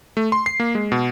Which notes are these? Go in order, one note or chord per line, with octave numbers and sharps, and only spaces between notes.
A3
C6
C7
A#3
G#3
B2